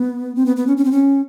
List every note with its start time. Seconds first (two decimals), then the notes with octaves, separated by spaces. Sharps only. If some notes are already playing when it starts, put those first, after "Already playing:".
Already playing: B3
0.36 C4
0.46 B3
0.57 B3
0.67 C#4
0.77 C#4
0.85 C4
0.92 C#4